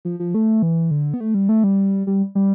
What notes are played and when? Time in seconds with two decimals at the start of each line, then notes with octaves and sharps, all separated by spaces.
0.05 F3
0.20 F3
0.34 A3
0.62 E3
0.91 D3
1.14 B3
1.20 A3
1.34 G3
1.49 A3
1.64 G3
2.07 G3
2.35 G3